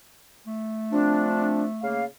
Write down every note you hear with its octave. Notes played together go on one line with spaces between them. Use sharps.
A3
F3 C4 D4
C#3 A#3 F5